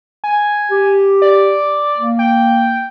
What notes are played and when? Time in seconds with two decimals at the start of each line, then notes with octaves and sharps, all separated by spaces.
0.24 G#5
0.72 G4
1.22 D5
1.98 A#3
2.19 G5